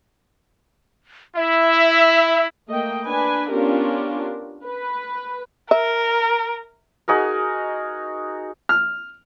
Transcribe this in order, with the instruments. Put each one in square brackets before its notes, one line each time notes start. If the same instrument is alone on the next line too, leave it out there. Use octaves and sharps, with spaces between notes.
[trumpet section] E4 [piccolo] E5
[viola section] A3 A#3 D#5 G5
D4 B4 G#5
B3 C#4 D4 F4 G4 A#4
B4
[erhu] A#4 [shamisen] E5
[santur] D#4 F#4 G#4 A#4
[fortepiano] F6